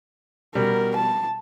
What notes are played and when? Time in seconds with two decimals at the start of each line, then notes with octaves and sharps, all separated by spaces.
0.55 B2 G3 A#4
0.96 A5